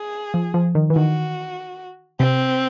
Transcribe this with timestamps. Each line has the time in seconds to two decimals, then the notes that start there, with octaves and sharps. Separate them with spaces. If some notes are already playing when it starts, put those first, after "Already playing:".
Already playing: G#4
0.34 F3
0.54 F3
0.75 D#3
0.90 E3
0.96 D#3 F#4
2.19 C3 C4